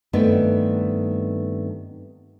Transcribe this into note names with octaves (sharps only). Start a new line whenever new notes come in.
G2 D#3 A3 B3 C4 B4